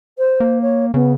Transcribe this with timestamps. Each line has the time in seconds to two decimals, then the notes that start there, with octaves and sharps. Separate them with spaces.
0.18 C5
0.40 A#3
0.61 C#5
0.94 C#3 B3